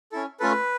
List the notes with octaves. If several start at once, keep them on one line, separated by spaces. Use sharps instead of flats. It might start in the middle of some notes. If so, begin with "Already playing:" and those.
C#4 E4 A4
A3 C#4 F4 A4 B4